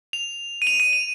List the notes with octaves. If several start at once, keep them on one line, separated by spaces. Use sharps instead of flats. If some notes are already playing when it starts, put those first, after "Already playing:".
F7
D#7
F7
D#7
F7